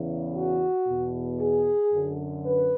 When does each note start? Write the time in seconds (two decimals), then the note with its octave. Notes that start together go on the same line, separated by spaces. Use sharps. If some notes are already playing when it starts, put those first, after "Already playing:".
Already playing: E2 C#3 E3
0.35 F#4
0.87 E2 B2
1.40 G#4
1.93 F#2 D3
2.45 B4